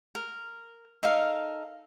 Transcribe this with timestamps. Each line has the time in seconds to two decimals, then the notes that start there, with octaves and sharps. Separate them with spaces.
0.15 A#4
1.03 D#4 A4 A#4 F5